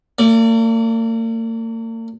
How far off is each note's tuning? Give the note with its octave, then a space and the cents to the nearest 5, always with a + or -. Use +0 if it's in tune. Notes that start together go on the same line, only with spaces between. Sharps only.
A#3 -45 D5 -20